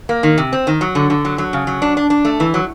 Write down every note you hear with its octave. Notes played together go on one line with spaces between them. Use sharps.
A#3
D#3
C3
C4
D#3
F#3
D3
D3
F#3
F#3
C#3
F#3
D4
D4
D4
A3
E3
F#3